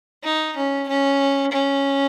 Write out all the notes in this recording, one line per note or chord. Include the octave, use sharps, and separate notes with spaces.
D#4
C#4
C#4
C#4